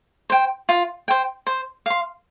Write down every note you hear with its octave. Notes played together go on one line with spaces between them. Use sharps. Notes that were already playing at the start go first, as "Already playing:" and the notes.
C5 G5
F4
C5 G5
C5
F5 C6